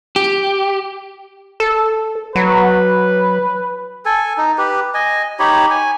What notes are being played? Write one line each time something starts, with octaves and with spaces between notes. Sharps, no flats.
G4
A4
F#3 B4
A4 G#5
D#4
G4 B4
D#5 G#5
D#4 G4 C#5 B5
G#5